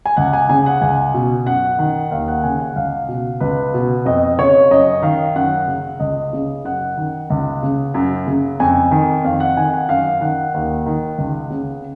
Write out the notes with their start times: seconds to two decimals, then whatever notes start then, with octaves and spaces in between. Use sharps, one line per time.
0.06 G#5
0.17 C#2 F#5
0.33 G#5
0.49 C#3 G#5
0.66 F#5
0.81 C#2 G#5
1.14 B2
1.46 F#2 F#5
1.79 D#3
2.11 D#2 F5
2.28 F#5
2.43 C#3 G#5
2.59 F#5
2.76 C#2 F5
3.08 B2
3.40 C#2 B4
3.74 B2
4.05 F2 D#5
4.38 C#3 C#5
4.71 F#2 D#5
5.02 D#3 F5
5.35 F#2 F#5
5.67 C#3
6.00 C#2 D#5
6.33 C#3
6.64 F#2 F#5
6.97 D#3
7.30 C#2
7.63 C#3
7.94 F#2
8.27 C#3
8.60 F2 G#5
8.91 D#3
9.24 F2 F5
9.40 F#5
9.57 D#3 G#5
9.73 F#5
9.89 F#2 F5
10.21 D#3 F#5
10.54 D#2
10.86 D#3
11.18 C#2
11.50 C#3